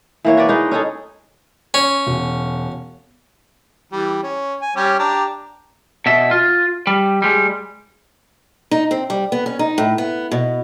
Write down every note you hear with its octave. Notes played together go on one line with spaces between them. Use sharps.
E3 A#3 C#5
F#4 B4 D5
G#3 D#4 B4
C#4 D#4 G#4 A4
C#4
E1
E3 G3
C#4
G#5
G3 C#4 G4
D4 G4 A#5
B2 E5
F4
G3
G3 G#3
D#4
C4
G3
B3
C#4
D#4
A2
B3
B2